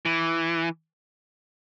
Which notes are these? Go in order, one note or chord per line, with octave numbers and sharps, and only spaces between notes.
E3